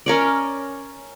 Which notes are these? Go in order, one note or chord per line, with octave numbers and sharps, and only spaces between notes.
C#4 A#4 C#5 D5